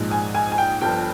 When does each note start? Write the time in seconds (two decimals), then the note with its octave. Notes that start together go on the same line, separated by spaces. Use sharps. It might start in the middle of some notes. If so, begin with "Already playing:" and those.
Already playing: A#1 G#2 F3 G#3
0.11 G#5
0.35 G#5
0.52 G#5
0.58 G5
0.81 G1 G2 F3 G5